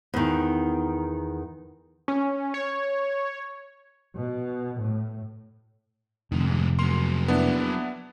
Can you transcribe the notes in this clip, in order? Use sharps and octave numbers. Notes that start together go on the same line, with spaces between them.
E2 D#3
C#4
C#5
B2
A2
F1 D3 D#3
G#2 C3
F#3 A#3 C6
B3 D4 E4